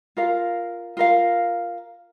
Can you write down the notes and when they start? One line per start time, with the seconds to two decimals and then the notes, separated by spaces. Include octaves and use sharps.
0.17 F4 A#4 F5
0.97 F4 A#4 F5